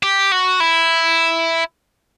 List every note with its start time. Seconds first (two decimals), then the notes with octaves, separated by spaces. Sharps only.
0.03 G4
0.32 F#4
0.60 E4